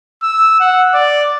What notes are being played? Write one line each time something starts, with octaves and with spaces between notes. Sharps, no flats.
E6
F#5
D5